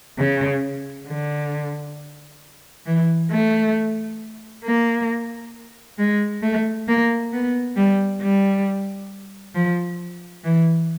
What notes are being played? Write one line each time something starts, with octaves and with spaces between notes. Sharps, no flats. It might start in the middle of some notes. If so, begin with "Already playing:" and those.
C#3
D3
E3
A3
A#3
G#3
A3
A#3
B3
G3
G3
F3
E3